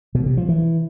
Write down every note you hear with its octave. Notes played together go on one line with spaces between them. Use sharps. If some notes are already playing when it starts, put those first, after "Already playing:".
B2
C3
F3
E3